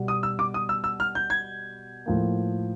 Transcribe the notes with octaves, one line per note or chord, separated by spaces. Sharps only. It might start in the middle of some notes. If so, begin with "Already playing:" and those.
Already playing: B2 G3 B3
D#6
E6
D6
D#6
E6
E6
F6
G6
G#6
A2 F3 A#3